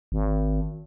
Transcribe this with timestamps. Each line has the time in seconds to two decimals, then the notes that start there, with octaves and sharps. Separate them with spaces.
0.12 G#1